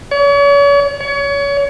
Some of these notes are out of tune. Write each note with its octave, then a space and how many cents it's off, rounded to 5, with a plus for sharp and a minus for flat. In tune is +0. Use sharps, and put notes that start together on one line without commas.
C#5 +40
C#5 +30